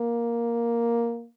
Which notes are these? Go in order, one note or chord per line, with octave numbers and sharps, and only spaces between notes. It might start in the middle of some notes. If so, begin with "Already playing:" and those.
Already playing: A#3